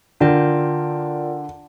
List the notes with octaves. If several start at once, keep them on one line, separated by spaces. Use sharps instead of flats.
D3 D4 F4 A#4 D5 G5